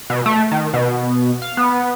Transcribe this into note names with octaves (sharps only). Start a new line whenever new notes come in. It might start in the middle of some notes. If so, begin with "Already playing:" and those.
B2
A3
D#3
B2
F5
B3